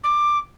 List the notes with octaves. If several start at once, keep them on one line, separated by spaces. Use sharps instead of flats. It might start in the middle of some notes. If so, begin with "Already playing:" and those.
D6